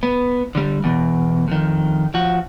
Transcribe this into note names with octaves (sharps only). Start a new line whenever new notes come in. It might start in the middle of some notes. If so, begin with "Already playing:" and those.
B3
D3 G3
E2 B2
F2 D#3
F3 F#4